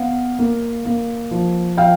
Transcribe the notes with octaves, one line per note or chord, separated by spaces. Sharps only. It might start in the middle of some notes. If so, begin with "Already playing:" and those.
Already playing: B3 F5
A#3
A#3
F3
F3 F5 G5